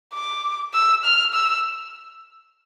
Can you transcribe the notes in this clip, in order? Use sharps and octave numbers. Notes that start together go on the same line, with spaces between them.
D6
E6
F6
E6